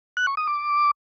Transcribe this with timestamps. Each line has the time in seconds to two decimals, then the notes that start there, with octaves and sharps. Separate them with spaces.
0.17 F#6
0.27 C#6
0.37 D#6
0.47 D6